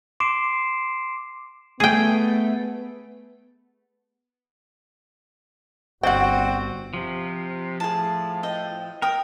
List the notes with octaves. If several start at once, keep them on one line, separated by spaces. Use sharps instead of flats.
C6 D6 C7 D7 E7
A3 B3 G#4 G5
G1 C4 F#4 F#5 G5
C3 F3
A2 G#4 A5
D#5 G5
A#4 G5 D#6